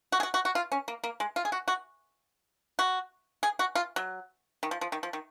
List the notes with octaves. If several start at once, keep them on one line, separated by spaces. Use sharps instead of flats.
F#4
G#4
F#4
F#4
F#4
F4
C#4
A#3
A#3
G#3
F4
G#4
F#4
F#4
F#4
G#4
F#4
F4
F#3
D#3
F3
F3
D#3
F3
D#3